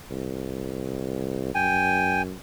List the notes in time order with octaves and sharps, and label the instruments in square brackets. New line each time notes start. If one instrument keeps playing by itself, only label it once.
[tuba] C2
[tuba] F#2 [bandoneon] G5 G#5